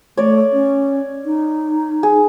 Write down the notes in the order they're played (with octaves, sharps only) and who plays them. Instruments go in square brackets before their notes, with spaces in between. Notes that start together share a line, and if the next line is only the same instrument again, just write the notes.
[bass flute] A3 [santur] C#5 D5
[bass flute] C#4
D#4
[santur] G#4